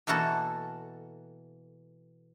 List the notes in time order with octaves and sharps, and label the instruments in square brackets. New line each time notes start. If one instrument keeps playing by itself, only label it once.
[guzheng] B2 E3 A#3 F#4 A4